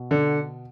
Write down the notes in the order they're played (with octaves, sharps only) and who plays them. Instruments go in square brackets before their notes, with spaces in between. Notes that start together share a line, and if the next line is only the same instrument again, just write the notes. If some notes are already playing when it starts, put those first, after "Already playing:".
Already playing: [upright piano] B2
[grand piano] D3